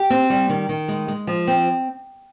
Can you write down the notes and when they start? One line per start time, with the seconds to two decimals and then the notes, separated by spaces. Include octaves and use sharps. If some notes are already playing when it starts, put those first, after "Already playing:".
Already playing: G4
0.10 C4
0.30 G3
0.50 D#3
0.69 D#3
0.88 G#3
1.08 G#3
1.27 F3
1.47 C4